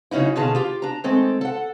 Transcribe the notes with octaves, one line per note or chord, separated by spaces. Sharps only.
C#3 F#3 C#4 D#4 E4
B2 D3 D#3 F4 G#4 A5
F4 G4
D4 A#5
D#3 G#3 A3 C4 A4
A4 F#5